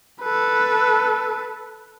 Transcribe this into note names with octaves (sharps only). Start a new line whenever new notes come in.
A4 B4